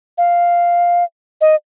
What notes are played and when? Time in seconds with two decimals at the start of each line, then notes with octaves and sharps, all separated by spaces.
0.18 F5
1.41 D#5